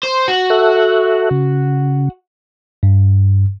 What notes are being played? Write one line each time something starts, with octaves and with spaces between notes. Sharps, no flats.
C5
F#4
A4 E5 F#6
C#3
G2